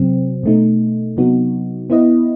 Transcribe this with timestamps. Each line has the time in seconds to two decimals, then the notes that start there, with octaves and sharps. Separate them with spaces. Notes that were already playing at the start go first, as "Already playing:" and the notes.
Already playing: C3 F#3 C4
0.43 B2 A3 D#4
1.17 C3 F#3 B3 D#4 F#4
1.90 B3 E4 B4 D#5